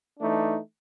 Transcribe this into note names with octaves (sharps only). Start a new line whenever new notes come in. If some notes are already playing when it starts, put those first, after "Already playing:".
E3 A3 D4 D#4